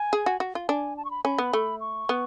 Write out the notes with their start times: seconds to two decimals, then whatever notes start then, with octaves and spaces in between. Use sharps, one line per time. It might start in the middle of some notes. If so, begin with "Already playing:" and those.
Already playing: G#5
0.13 G#4
0.26 F#4
0.40 F#4
0.55 F4
0.68 D4 G#5
0.97 A5
1.05 C#6
1.11 B5
1.25 C#4 B5
1.38 B3
1.53 A3
1.81 C#6
2.09 B3